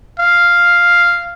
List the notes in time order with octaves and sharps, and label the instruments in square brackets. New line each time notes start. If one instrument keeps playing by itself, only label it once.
[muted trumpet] F5